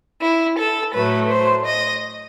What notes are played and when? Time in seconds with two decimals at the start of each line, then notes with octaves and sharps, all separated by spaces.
0.22 E4
0.58 A4
0.94 A2 F#3 A3 B4
1.30 C5
1.66 D#5